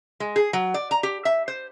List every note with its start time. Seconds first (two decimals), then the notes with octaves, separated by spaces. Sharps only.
0.20 G#3
0.36 G#4
0.53 F#3
0.74 D5
0.91 A#5
1.03 G4
1.25 E5
1.48 C5